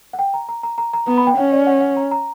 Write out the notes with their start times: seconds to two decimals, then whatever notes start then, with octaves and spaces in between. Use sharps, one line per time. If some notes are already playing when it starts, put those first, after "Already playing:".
0.13 F#5
0.19 G5
0.34 A#5
0.49 A#5
0.63 A#5
0.78 A#5
0.93 A#5
1.08 B3 A#5
1.18 B5
1.27 G5
1.37 C#4 F#5
1.52 D5
1.67 F#5
1.81 F#5
1.97 A#5
2.11 A#5